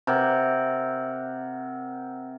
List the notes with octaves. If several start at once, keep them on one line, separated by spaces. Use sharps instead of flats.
C3 A#4 F#5